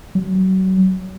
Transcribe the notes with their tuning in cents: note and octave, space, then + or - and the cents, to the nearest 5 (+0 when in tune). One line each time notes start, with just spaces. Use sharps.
F#3 +30